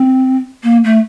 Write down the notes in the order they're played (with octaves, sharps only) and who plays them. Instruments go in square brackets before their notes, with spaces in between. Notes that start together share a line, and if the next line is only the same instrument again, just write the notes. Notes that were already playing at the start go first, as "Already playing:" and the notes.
Already playing: [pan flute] C4
A#3
A3